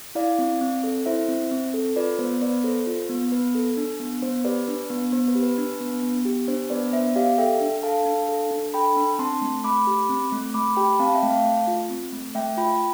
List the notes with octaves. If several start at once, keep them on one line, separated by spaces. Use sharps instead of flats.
E4 D5 F5
C4
C4
A4
E4 C5 E5
C4
C4
A4
F4 B4 D5
B3 C5
B3 B4 D5
A4 C5
F4
B3
B3 B4
A4
D4
B3
B3 C5
G4 B4 D5
D4 B4
B3
B3 C5
B4
G4
B4
D4
B3
B3
G4
D4 C5
B3 B4 D5
B3 C5 E5
G4 D5 F5
A4 E5 G5
D4
A4 F5 A5
D4
A4
D4
A4 G5 B5
D4
C4 A5 C6
A3
A3 B5 D6
G4
C4
A3
A3 B5 D6
G4 G5 B5
C4 F5 A5
E5 G5
A3
F5 A5
A3
F4
C4
A3
A3 E5 G5
F4 G5 B5